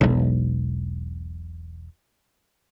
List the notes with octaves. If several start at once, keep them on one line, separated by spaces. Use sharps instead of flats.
E1 B1